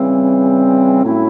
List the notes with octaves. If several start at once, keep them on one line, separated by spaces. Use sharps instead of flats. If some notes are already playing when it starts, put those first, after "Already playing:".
Already playing: C#3 E3 G3 C4
A2 F#3 A3 C#4 E4